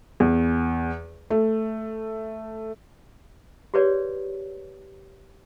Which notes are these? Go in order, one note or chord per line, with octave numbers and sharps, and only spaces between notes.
E2
A3
G4 G#4 B4 C#5 D5